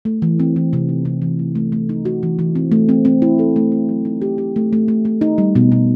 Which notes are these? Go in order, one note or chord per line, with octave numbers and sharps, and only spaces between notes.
A3
E3
C4
E3
C3
D#4
C3
E3
A3
A3
A3
D#4
F#4
E3
E3
C4
A3
C4
C4
E4
A4
A3
E4
F#3
D#4
G4
G4
A3
A3
A3
A3
D#4
G3
B2
B2